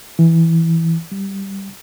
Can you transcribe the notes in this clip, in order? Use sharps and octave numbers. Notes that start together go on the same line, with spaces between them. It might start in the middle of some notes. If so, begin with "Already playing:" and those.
E3
G3